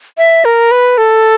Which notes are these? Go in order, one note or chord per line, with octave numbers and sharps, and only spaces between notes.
E5
A#4
B4
A4